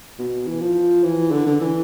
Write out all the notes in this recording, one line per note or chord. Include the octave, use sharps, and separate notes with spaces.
B2
E3
F3
E3
D3
D3
E3